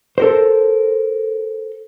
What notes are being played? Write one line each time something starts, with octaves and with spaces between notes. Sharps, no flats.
A4 A#4 C5